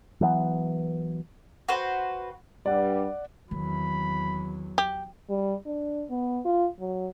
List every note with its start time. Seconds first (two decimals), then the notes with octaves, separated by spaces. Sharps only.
0.21 E3 F#3 G#3 B3
1.68 F#4 B4 C5
2.66 G2 G3 D5 F#5
3.51 E2 D#3 F#3 C4 B5
4.78 G4
5.29 G3
5.66 D4
6.09 B3
6.45 F4
6.79 F#3